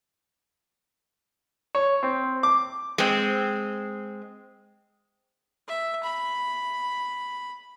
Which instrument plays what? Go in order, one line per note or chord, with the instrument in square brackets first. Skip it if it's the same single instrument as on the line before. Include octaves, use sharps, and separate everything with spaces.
[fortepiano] C#5
C4
D6
[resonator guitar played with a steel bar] G#3 C4
[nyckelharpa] E5
B5